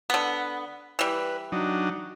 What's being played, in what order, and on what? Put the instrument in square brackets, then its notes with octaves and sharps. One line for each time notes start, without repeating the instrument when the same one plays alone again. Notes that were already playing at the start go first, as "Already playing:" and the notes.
[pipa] D3 B3
[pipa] E3 G3 [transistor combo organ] B4
[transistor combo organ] F#3 D4 D#4